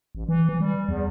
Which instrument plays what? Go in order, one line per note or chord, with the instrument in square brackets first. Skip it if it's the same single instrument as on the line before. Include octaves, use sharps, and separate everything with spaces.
[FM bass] A1
E3
E3
G3
E2